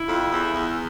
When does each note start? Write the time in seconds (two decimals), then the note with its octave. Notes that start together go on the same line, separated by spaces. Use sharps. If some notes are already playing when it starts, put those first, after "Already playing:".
Already playing: E4
0.08 F2
0.32 E2
0.54 E2